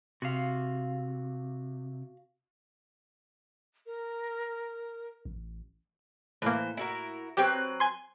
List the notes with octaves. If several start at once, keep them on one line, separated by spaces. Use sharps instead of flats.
C3 F#4 F5
A#4
A1
A2 E3 A#3 C5
E4 F#4 A#4
F#3 C4 G4 B4 G5
G#5 C6